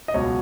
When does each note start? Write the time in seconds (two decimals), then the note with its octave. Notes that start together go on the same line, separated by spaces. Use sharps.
0.08 D#5
0.14 C#2 B2 F#3 C#5